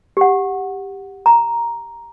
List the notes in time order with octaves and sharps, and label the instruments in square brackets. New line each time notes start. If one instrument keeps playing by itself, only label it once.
[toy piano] G4 F#5
A#5